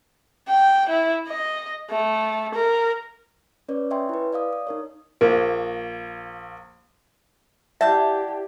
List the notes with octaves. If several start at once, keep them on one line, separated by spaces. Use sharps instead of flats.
G5
E4
D#5
A3
A#4
C#4 B4 C#5 D5
C#5 D#5 E5 G5 G#5 C6
E4 B4
D5 D#5 F5 D#6
D#6
D#4 A#4 C#5
A#1 A#3
E4 G4 D5 E5 F#5 A5 G6